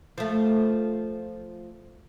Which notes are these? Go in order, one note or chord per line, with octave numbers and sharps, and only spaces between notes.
F3 A3